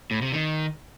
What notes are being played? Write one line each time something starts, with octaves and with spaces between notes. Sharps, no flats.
A2
C3
D#3